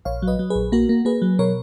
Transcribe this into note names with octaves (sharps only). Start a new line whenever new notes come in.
A#1 C#5 F5
F#3
B4 D#5
F#3
A#1 G#4 B4
A#3 F#4 A#4
A#3
A#3 G#4 B4
F#3
B2 A#4 C#5